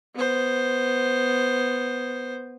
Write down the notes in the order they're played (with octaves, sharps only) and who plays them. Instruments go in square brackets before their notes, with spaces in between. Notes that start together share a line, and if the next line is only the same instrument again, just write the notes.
[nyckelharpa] B3 C5